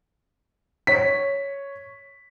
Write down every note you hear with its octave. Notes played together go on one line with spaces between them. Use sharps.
C#5 B6